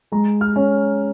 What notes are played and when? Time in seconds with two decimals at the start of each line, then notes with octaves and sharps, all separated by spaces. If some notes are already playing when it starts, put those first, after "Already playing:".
0.12 G#3 A#5
0.41 F6
0.56 C#4